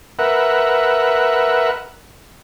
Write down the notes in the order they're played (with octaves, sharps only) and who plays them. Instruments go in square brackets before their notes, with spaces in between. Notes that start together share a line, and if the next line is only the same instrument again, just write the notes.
[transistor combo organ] A#4 B4 E5 F#5